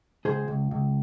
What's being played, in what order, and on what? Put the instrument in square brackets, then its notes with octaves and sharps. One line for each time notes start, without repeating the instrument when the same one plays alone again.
[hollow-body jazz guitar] C#2 G#4 C5
C#2
C#2